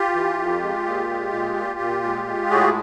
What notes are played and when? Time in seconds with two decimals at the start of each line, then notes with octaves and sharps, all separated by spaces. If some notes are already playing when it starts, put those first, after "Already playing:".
Already playing: F4 G4
0.15 E3
0.39 F2
0.62 G#3
0.86 A#2
1.09 G#3
1.33 A#2
1.56 A#2
1.80 A#2
2.03 G#3
2.27 G#3
2.50 A2 F#4 G#4